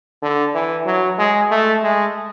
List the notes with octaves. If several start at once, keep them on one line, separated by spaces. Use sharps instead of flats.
D3
E3
F#3
G#3
A3
G#3